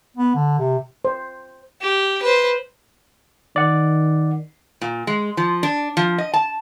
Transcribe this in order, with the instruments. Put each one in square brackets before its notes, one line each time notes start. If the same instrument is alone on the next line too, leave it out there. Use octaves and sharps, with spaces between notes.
[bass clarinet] B3
D3
C3
[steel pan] C5
[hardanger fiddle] G4
B4 C5
[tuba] D#3 [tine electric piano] D5 F#5
[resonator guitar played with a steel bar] A#2
G#3
F3
D4
F3
D#5
A5